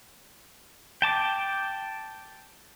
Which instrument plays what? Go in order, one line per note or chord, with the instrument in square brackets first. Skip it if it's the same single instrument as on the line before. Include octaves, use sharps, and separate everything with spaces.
[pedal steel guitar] G5 A5 D6